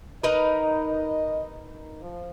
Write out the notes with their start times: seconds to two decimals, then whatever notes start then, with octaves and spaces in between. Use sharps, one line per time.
0.23 D#4 A#4 B4 D#5
2.01 F3